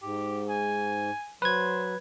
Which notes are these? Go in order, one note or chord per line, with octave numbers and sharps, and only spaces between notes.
G#2 G4
G#5
F#3 B4 C5 G#6